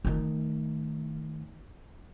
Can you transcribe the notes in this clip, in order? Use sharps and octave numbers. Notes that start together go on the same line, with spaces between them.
D#3 A3